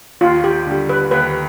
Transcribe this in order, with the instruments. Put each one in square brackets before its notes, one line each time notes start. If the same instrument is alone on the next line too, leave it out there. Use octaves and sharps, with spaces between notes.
[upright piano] D#2 [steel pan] F4
[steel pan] G4
[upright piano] D3 G3
[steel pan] B4
[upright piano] D#2 [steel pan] B4